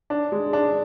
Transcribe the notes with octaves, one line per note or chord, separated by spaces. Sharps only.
D4
G#3
D4